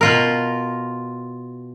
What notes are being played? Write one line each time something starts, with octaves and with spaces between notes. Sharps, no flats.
B2 F4 A#4